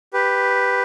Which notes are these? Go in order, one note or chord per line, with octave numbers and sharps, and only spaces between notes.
G4 B4